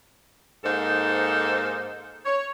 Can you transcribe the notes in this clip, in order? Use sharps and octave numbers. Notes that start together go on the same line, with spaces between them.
G#2 A#3 D#4 A4 C5
C#5